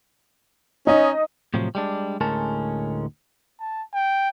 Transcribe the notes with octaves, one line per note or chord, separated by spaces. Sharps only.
C#4 D#4 D#5
A2 C3 F3 F#3
G3 G#3 D4
D2 A2 G#3 C#4 A#4 A5
A5
G5